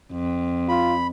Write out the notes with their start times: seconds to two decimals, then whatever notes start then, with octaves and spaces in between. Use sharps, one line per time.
0.12 F2
0.69 F4 B5